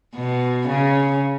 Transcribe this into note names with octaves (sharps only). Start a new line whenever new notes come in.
B2
C#3